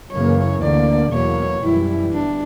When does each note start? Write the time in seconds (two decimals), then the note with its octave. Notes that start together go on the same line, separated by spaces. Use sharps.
0.12 F#2 C#3 E3 A#3 C#5
0.62 D2 D3 A#3 D5
1.13 E2 B2 F#3 A#3 C#5
1.63 F#2 E3 G3 E4
2.13 G1 D4